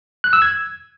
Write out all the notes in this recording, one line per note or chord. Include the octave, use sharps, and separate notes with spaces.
F#6
E6
G#6